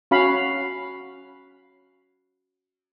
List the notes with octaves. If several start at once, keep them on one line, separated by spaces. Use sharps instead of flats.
C#4 F#4 F5 B5